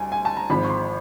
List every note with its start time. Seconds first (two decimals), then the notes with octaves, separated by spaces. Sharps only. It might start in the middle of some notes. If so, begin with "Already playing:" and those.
Already playing: D2 G3 G#5
0.12 G#5
0.25 A5
0.37 A#5
0.50 G#1 G#2 F3 B5
0.64 C#6
0.69 C6